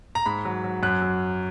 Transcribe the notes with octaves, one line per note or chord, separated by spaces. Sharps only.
A#5
G#2 B5
F#3
F#3
F#2 F#6
F#3